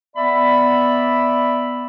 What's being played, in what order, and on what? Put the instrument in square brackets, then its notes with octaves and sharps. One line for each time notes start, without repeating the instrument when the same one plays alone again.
[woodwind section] B3 D5 E5 B5